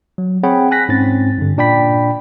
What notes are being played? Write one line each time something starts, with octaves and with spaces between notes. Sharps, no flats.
F#3
C4 G#4 C#5 F#5 G5 B5
G#5 F#6 A#6 B6
G#2 C4 C#4 A6
G2 D3
A#2 D4 D5 G5 B5 B6